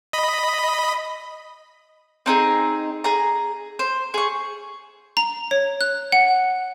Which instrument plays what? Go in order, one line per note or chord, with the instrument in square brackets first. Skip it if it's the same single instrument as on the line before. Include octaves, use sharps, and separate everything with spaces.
[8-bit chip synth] D#5 B5
[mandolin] C4 D#4 G#4
G#4 A#5
C5
G#4 C#6
[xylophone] A#5
C#5
F#6
F#5